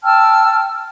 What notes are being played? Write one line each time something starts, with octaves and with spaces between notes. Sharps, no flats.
G5 A5 E6 F6